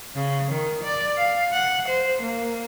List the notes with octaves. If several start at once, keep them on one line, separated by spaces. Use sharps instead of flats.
C#3
D#3
D5
F5
F#5
C5
A#3